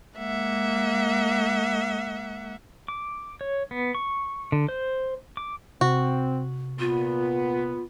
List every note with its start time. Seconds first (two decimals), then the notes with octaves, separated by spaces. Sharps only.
0.17 G#3 A#3 E5 F#5
2.88 D6
3.41 C#5
3.71 B3
3.95 C#6
4.52 D3
4.68 C5
5.37 D6
5.81 C3 C4 F#4
6.79 A#2 B3 F4